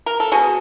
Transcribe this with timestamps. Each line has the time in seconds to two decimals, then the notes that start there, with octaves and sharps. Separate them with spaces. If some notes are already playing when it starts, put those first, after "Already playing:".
0.06 A#4
0.20 A4
0.32 B2 F#4 G#4